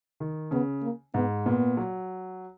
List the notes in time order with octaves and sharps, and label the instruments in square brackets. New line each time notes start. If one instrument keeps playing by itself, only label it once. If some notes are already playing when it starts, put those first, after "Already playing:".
[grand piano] D#3
[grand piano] C#3 [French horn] B3
[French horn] A#3
[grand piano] G#2 [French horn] B3
[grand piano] A#2 [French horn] B3
[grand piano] F#3